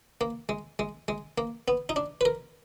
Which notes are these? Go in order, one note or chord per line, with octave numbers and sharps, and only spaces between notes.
A#3
G#3
G#3
G#3
A#3
B3
D#4
D4
B4
A#4